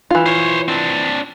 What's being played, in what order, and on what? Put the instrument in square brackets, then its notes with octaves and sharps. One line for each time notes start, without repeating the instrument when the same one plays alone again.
[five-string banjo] E3 F4
[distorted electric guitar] C5 C#5
C4 D4